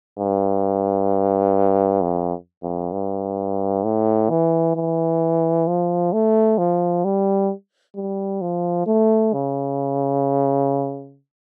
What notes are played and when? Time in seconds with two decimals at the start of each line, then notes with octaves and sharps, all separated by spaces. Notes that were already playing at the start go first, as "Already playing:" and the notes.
0.19 G2
2.01 F2
2.63 F2
2.92 G2
3.84 A2
4.30 E3
4.76 E3
5.67 F3
6.13 A3
6.58 F3
7.05 G3
7.96 G3
8.41 F3
8.87 A3
9.33 C#3